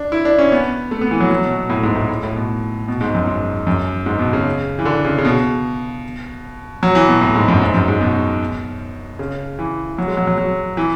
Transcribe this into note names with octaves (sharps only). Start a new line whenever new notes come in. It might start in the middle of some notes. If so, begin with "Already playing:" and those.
Already playing: D4
E4
D4
C#4
B3
A3
B3
E3
F#3
F#3
B2
B2
A2
G#2
A2
A2
A2
B2
B2
G#2
F#2
G#2
F#2
G#2
B2
C#3
E3
D3
C#3
C#3
B2
F#3
E3
B2
A2
G#2
F#2
G#2
F#2
G#2
B2
C#3
E3
F#3
G#3
F#3
F#3
F#3
E3